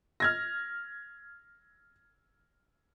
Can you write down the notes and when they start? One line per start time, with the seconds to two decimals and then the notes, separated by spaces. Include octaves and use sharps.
0.20 F6 G#6 A#6